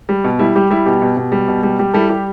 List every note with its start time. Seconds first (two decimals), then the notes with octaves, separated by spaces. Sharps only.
0.09 G3
0.24 B2
0.39 G3 E4
0.55 G3 G4
0.70 G3 E4
0.86 B2 G4
1.02 B2
1.17 B2
1.32 G3
1.48 B2
1.63 G3
1.79 G3 G4
1.94 G3 E4 A4
2.09 G3 G4